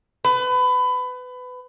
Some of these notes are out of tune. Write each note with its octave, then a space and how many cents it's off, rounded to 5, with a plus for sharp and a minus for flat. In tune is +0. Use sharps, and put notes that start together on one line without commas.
B4 +25